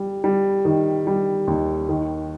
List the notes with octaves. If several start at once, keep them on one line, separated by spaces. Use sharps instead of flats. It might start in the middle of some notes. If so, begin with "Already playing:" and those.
Already playing: G3
G3
D#3
G3
D#2
D#3